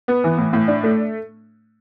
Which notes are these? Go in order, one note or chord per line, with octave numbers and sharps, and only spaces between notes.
B3
E3
A2
A2
D4
A3